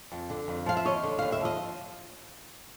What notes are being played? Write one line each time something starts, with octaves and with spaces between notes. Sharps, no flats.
F2
D3
F2
F3 F5
E5
D#2 C#5 D#5
D3
D#2 F5
E5
F3 D#5